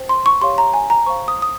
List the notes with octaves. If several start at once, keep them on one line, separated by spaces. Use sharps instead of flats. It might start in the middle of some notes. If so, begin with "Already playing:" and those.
Already playing: C5 G5
C6
C#6
G4 C#5 F5 C6
A#5
G#5
A#5
C5 F5 C#6
D#6
D#6